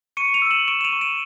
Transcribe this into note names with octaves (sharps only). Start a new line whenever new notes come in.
C#6 C#7 D#7
D#7 F7
E6
E7 F#7
C#6 D7 E7
E7
D#7 F7
C#6
D7 E7